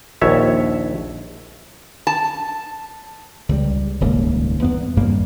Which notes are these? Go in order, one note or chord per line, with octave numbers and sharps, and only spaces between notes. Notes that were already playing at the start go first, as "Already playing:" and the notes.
A#1 D#2 C#5 E5
A5
C#2 G3
D#1 C#2 G#2 A#3
E2 G2 B3
G#1 G2 G3 A#3